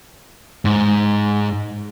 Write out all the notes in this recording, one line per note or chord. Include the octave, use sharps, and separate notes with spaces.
G#2